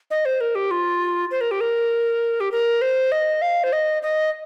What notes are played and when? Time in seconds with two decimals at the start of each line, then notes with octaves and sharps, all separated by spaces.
0.11 D#5
0.25 C5
0.41 A#4
0.55 G4
0.71 F4
1.31 C5
1.41 A#4
1.51 G4
1.61 A#4
2.40 G4
2.52 A#4
2.82 C5
3.12 D#5
3.42 F5
3.64 C5
3.73 D#5
4.02 D#5